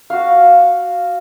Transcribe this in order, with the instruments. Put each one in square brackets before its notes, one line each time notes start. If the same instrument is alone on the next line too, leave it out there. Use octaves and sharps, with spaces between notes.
[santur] F#4 F5